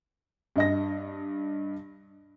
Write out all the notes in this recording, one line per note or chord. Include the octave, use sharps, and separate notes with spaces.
G2 D#5 A#6